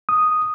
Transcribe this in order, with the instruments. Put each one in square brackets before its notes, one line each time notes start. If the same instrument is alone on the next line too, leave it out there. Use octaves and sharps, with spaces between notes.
[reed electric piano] D#6